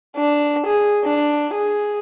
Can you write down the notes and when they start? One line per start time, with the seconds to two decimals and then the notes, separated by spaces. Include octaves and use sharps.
0.17 D4
0.67 G#4
1.04 D4
1.54 G#4